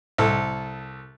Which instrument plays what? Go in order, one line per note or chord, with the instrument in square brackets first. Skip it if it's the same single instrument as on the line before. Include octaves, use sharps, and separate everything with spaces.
[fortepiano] C2 A4